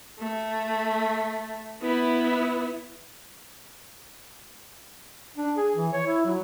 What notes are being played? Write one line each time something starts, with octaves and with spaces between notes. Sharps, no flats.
A3
B3 E4
D4
G#4
E3
C#5
E4
F#3